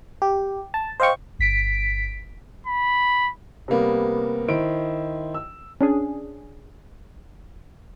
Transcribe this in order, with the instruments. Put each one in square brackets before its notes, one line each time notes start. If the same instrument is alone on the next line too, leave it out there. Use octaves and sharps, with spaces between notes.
[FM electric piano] G4
A5
C5 D#5 F5 G5 C#6
[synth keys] G1 B6 D7
[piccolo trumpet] B5
[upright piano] C3 G3 A#3 B3
D#3 E4 C5 D7
E6
[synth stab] C#4 D4 G#4